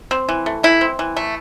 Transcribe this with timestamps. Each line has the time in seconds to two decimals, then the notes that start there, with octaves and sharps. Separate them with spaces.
0.11 C4
0.29 E3
0.46 A3
0.63 E3 E4
0.81 C4
0.99 E3
1.16 A3